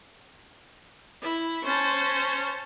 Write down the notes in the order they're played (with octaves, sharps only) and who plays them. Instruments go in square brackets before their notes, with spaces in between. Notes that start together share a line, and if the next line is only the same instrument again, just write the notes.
[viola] E4
[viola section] C#4 [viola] C5 A5